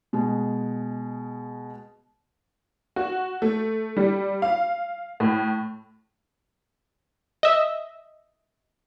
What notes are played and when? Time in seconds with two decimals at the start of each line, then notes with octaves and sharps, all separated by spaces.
0.13 B2 G#3
2.96 F#4
3.42 A3
3.97 G3
4.42 F5
5.20 A2
7.43 D#5 E5